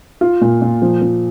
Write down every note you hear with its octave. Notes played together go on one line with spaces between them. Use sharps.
F4
A#2
A#2
F3
F3